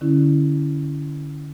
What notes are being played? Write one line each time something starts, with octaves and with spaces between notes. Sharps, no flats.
D3 C#4 E4